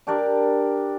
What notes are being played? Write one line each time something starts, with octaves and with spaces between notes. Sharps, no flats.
D4 G4 A#4 D5